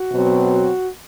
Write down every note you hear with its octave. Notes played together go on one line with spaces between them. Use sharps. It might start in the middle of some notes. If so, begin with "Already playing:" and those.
Already playing: F#4
B2 F#3 C4
F#4